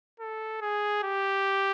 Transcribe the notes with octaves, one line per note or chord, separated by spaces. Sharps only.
A4
G#4
G4